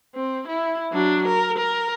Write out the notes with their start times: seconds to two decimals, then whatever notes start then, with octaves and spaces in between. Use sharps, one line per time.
0.15 C4
0.47 E4
0.92 F#3 D4
1.27 A#4
1.58 A#4